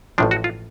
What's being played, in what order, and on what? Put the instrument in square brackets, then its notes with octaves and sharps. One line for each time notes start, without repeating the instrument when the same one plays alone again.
[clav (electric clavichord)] A1 A2 F3 D4
F#4
F4